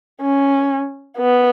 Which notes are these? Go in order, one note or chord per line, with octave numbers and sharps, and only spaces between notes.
C#4
B3